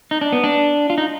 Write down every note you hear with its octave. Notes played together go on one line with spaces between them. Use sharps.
D#4
D4
B3
D4
F4
D#4